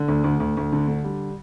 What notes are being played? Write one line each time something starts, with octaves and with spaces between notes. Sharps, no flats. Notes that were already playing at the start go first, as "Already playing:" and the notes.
Already playing: D3
D2
D2
D2
D2
D3
D3
G3